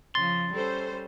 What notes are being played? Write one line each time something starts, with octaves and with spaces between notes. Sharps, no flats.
C#3 F3 C6 A6
G3 C#4 A4 C5